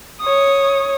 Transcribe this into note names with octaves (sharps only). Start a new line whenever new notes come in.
C#5 D#6